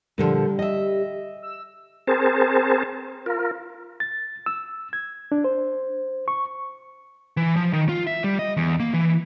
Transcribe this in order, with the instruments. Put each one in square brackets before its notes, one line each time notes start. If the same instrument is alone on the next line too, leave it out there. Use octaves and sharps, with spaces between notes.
[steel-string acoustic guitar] A#2 D3 F3 [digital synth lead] G3
[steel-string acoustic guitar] D#5 E5
[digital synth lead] E6
[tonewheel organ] C4 G#4 A#4 C5 A5
F4 A#4
[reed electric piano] A6
E6
G#6
D4
C5
C#6
[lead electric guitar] E3
F3
D#3
F4
E5
G3
D#5
E2
A#3
E3